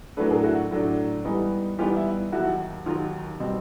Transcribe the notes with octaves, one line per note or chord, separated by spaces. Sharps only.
A2 F#3 A3 D4 A4 B4
G#4 A#4
E4 F#4
A2 F#3 A3 D4
G#2 E3 G3 B3 D#4
G#2 E3 G3 B3 D#4 F4 G4
E4
D#2 D#3 F#3 E4 F#4
D#2 D#3 F#3 D#4 F4
B2 G3 C4